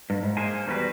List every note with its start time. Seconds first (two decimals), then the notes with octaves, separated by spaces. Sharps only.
0.10 G2
0.23 G#2
0.37 G#3 A#3 D#4 C5 G#5
0.66 E2 D#3 G3 D#4 F#4 B4